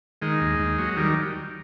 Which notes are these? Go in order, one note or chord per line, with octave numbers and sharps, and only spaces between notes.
D#3 G#3
D#2
D#2
F#3
D#3 G3